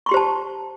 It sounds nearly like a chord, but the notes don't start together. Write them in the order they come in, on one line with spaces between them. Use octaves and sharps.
C#6 C6 G4 C5 A5